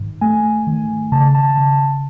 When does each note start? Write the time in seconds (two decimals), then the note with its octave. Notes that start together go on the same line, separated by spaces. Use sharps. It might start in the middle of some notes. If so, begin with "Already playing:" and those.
Already playing: G#2 D#3
0.21 A3 G#5
0.67 D#3
1.12 C#3 A5
1.35 A5
1.58 C#3